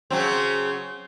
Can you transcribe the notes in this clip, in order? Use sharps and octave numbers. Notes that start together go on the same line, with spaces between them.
C#3 F#3 C4